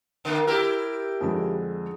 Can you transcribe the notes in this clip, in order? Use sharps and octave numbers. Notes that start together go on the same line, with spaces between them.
D3 A#3
E4 G4 A#4
F2 D3 G#3